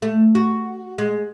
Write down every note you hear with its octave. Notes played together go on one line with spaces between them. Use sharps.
A3
F#4
G#3